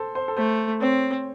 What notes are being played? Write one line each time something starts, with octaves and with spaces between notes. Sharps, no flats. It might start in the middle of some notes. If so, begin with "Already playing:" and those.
Already playing: A4 C5
C5
A4
A3 C5
C4 C#5